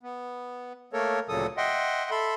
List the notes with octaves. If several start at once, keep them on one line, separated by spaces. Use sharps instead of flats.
B3
A3 A#3 A4 A#4 C#5
D2 A#2 C#3 F#3 A4 D#6
D#5 E5 F#5 G5 C6
A4 E5 B5 C6